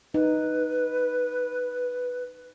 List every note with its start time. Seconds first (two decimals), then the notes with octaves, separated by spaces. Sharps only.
0.14 D#4 B4